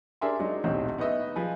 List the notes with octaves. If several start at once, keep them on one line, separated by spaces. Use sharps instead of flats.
D4 G#4 A#4 E5 G#5 C6
F#3 G#3 D4 D#4
D#1 B1 A2 C4 D#4
B3 D#4 B4 D#5 E5
F3 G#4 B4